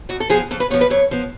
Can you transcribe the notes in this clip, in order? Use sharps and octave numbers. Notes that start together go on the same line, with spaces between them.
F2 F#4
A4
F3 B3 G#4
F2 A4
B4
F3 B3 C#5
B4
F2 C#5
F3 B3